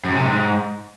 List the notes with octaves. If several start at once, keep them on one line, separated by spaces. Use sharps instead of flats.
F#2
C3
G#2